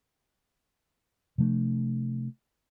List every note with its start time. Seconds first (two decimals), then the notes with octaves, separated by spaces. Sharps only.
1.38 C3 F3 A3 D4